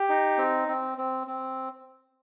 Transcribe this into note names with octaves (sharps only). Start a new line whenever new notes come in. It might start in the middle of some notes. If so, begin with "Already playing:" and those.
Already playing: G4
D#4
C4
C4
C4
C4